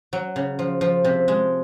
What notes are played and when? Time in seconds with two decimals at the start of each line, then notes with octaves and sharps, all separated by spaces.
0.13 F#3
0.36 C#3
0.59 F3
0.81 F3
1.04 C3
1.28 G#3